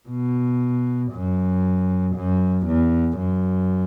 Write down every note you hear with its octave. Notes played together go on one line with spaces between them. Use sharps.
B2
F#2
F#2
E2
F#2